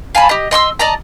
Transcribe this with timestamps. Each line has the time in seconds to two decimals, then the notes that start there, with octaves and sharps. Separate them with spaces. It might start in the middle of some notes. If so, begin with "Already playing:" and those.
0.15 F5 G#5 A5 B5
0.29 G4 D#5
0.51 D#5 C6 C#6 E6
0.79 D5 D#5 A5 A#5